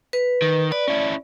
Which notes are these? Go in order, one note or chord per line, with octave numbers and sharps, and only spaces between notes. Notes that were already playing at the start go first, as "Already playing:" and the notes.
B4
D#3
B4 D5
C#4 E4